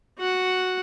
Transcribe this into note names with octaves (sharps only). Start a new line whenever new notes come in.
F#4 F#5